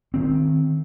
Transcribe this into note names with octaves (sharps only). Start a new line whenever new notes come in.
D#3 C4